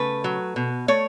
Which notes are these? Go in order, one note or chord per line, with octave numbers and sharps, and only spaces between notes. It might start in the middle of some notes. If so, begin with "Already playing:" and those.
Already playing: C#3 A3 B4
F#3
B2
A3 C#5